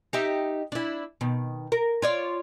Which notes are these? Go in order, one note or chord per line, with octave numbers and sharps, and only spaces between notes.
D#4 G4 E5
D4 E4
B2 D#3
A#4
F4 C#5 D5